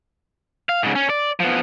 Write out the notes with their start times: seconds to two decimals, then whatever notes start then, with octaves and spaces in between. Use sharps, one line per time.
0.69 F5
0.83 G#2 C#3
0.95 C#4
1.09 D5
1.40 F3 B3